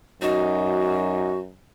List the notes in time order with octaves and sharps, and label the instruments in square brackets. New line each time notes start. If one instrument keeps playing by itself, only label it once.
[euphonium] F#2 [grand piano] D#4 [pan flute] F#4